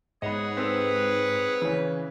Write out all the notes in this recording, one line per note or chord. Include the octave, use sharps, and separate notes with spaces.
G#2 B3 G#4 C#5 D#5 F#5
C4 A4 B4
C#3 E3 C#4